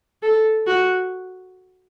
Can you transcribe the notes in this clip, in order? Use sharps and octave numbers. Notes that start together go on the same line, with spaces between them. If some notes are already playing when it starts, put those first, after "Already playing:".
A4
F#4